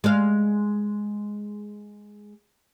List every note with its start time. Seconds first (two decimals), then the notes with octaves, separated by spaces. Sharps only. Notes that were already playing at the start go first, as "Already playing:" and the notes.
0.04 G#3 F5